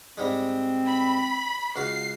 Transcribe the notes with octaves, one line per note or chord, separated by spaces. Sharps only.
G#2 G3 G#3 C4
B5
C#2 F#4 F5 C7